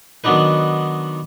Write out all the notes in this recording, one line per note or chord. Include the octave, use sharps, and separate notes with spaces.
D#3 F#3 B3 D4 D#4 B4